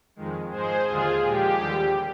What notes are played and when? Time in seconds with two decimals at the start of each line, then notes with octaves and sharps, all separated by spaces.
0.16 F2 D#3 G#3
0.51 G#2 F3 G#3 G#4 C5
0.86 D#2 D3 G#3 F4 G#4
1.22 A#2 F3 G#3 G4
1.57 D#2 D3 G3